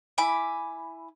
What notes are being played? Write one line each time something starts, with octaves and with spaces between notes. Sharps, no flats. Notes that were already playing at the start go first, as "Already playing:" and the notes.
E4 G#5 B5 D6